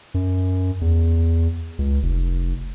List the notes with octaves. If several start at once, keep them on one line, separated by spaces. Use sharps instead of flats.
F#2
E2
C#2
F1